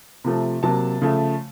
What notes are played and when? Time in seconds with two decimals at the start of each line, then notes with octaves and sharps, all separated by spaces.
0.24 C3 F3 A3
0.63 C3 F#3 A#3 A5
1.01 C#3 F3 A3